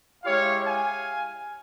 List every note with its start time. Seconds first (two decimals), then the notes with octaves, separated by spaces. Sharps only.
0.24 G#3 E4 G4 C#5 F5
0.66 F5 G#5